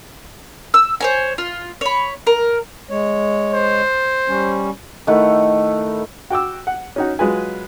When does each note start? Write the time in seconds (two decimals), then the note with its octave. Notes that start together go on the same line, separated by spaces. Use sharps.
0.74 E6
1.00 C5 C#5 G#5
1.38 F4
1.81 C#5 B5
2.27 A#4
2.90 G#3 C#5
3.53 C5
4.28 G3 C#4
5.07 D#3 A3 E4 F#5
6.30 F#4 G5 D6 E6
6.67 F#5
6.96 C#4 D#4 F#4
7.19 F#3 G#3 F4 B4 G#5